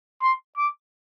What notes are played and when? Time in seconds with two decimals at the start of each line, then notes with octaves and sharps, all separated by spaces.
0.23 C6
0.58 D6